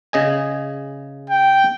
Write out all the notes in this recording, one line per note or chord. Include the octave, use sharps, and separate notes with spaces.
C#3 D#5 G#5
G5